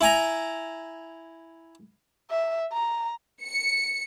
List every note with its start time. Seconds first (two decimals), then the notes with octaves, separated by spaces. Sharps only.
0.01 E4 G#5 A#5
2.30 E5
2.73 A#5
3.43 C#7